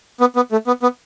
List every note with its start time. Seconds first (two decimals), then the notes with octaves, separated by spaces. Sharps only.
0.20 B3
0.36 B3
0.52 A3
0.67 B3
0.83 B3